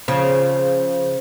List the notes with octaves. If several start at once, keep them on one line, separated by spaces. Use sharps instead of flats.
C#3 F3